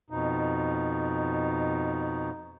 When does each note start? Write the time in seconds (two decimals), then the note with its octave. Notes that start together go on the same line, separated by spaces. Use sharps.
0.10 F2 B2 D#4